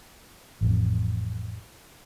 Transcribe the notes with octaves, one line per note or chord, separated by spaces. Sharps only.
A1 F2